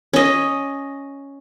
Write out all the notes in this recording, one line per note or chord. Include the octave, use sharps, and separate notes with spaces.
C#4 D#5